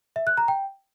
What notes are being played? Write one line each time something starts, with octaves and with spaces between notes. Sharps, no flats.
E5
F#6
A#5
G5